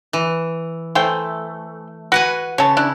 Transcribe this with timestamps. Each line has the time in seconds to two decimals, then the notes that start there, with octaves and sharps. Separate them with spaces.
0.13 E3
0.95 E3 A3 C5 G5
2.12 F#4 B4 F#5 G#5
2.58 C#3 C#5 A5
2.77 D4 E4